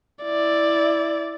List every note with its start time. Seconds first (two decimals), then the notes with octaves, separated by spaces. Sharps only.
0.24 E4 D5